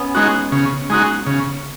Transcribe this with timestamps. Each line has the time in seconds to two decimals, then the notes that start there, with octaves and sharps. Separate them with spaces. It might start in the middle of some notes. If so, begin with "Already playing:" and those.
Already playing: B3 C#4
0.15 G#3 D#4 F#4
0.52 C#3
0.90 G#3 D#4 F#4
1.27 C#3